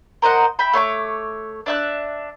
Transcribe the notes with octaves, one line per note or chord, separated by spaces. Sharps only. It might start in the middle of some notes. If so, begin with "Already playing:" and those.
A#4 C5 D#5 F#5
E5 G5 B5
A3 C#5 C6 D6
D4 E5 F#6